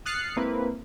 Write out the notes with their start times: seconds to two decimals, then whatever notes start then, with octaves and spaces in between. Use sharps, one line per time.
0.05 D#6 F6 F#6 A6 C7 C#7
0.36 G#3 A#3 C4 E4 B4